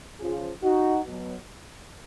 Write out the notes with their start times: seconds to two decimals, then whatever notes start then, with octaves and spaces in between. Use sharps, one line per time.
0.20 C#3 F3 F4 G#4
0.63 D#4 F#4
1.05 B2
1.10 F#3